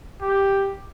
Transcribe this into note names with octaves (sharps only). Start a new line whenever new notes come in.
G4